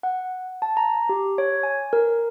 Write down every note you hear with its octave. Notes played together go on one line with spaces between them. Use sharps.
F#5
A5
A#5
G4
C#5
G#5
A#4